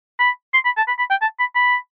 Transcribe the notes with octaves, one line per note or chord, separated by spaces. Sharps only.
B5
C6
B5
A5
B5
B5
G5
A5
B5
B5